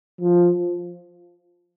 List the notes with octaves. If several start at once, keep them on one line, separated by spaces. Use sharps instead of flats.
F3